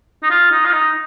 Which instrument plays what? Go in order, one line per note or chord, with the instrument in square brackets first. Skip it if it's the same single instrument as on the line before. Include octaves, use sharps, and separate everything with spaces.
[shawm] D#4
F4
D#4
F4
D#4